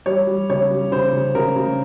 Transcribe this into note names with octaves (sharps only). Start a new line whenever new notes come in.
G3 C#5
G3
C#3 C#5
G3
C#3 C5
C#3
C#3 A#4
C#3